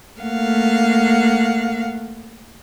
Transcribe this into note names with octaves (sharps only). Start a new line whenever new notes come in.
A3 A#3 F5 F#5